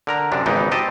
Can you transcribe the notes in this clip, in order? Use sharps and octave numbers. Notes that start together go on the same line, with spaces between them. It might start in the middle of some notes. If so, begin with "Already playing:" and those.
D3 A#4 A#5
F#2 C3 D4
G#1 C#2 E3 B3 D#4 G5
C4 G4 D#5 A5